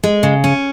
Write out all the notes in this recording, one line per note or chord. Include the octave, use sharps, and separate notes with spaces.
G#3
C#3
C#4